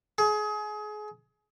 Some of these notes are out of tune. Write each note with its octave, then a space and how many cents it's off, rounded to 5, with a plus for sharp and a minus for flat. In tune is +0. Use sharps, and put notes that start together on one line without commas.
G#4 +30